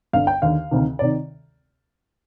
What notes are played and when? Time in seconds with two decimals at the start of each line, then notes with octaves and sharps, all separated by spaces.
0.13 G1 G2 D3 F5
0.27 G5
0.42 D#2 D3 F5
0.71 D2 C3 D#3
0.99 C3 D#3 D5